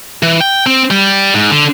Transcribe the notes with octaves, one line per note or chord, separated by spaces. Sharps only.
E3
G5
C4
G3
G#2
D3